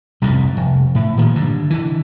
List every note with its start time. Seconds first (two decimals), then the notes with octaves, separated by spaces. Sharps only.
0.22 C2 F2 G#2
0.57 F1
0.95 A2
1.17 A#2 D#3 F3
1.36 G2 D3
1.70 D3 E3